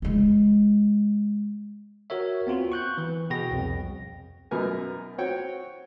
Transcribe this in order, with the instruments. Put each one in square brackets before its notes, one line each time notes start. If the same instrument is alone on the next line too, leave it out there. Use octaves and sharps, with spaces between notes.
[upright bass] G#3 E4
[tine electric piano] F#4 A#4 C#5 E5
B3 C4 F4 F#4
C#6 F#6 G6
E3
B2 F#4 G#4 G5 A#6
C2 F2
[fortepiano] F#2 B2 B3 A#4 G#5
C4 F#4 C#5 G5